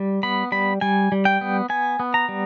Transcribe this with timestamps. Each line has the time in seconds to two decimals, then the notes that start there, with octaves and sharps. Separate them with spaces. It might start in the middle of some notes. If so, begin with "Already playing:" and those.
Already playing: G3
0.23 B3 B5
0.52 G3 B5
0.81 G3 G#5
1.12 G3
1.25 G5
1.41 B3
1.69 B3 G#5
2.00 B3
2.14 A#5
2.29 G3